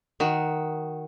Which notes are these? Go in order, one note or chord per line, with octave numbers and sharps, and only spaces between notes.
D#3 F#4